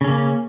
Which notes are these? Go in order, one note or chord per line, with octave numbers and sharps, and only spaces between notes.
C#3 A#3 C#4